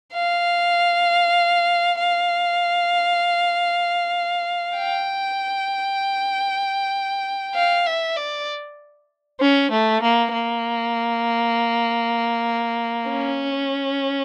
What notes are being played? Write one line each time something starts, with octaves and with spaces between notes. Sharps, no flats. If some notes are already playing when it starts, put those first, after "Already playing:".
F5
F5
G5
F5
E5
D5
C#4
A3
A#3
A#3
C#4